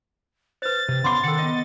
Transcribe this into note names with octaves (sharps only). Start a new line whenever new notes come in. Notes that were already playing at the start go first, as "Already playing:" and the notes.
B4 C5 A6
C3
C#3 B3 F5 C6 D6
D#3 A4 F#5
B3 D#5